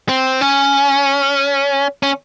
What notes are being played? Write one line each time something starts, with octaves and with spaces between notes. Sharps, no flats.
C4
C#4
C#4